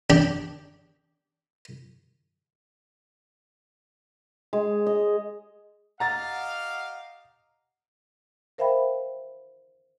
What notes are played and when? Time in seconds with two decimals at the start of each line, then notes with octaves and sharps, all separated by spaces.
0.10 D4 G4
4.53 G#3
4.87 D#5
6.00 G4 D#5 F5 F#5 A#5 A6
8.58 A#4 C5 E5 F5 G5 B5